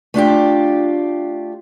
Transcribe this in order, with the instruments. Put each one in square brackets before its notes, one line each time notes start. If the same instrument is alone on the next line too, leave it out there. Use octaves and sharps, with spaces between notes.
[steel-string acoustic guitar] A3 D4 F4 G4